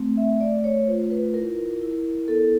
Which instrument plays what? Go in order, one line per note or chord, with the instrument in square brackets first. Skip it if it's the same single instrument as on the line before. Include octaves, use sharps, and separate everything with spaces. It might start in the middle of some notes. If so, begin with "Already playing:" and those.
Already playing: [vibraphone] A3 C4
E5
A3 D5
C#5
F4 C5
B4
E4 A#4
E4
B3 A4